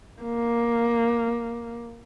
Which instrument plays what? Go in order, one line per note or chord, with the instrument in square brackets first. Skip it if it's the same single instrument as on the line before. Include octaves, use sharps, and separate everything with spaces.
[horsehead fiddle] A#3